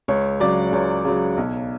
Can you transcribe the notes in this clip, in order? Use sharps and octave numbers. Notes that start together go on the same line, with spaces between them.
C#2 C#5
C#3 F#3 D5
C#2 C#5
C#3 F#3
B1